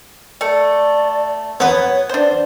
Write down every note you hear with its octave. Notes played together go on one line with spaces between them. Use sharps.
A3 A4 D5
F#3 B3 B4 C#5
D4 C5 D5